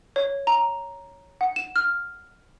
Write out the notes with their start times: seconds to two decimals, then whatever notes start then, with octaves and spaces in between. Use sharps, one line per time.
0.16 C#5
0.47 A#5
1.41 F#5
1.56 E7
1.76 F6